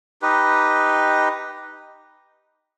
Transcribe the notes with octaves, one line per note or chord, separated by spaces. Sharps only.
D#4 G4 B4 D#5